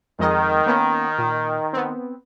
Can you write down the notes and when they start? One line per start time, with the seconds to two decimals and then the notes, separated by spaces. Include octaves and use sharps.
0.19 F2 D#3 G#3 D#5
0.66 A#3 B3 C#4
1.18 A#2
1.73 B3 C4